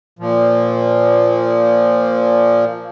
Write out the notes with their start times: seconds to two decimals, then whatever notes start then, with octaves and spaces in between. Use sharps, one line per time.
0.19 A#2 F3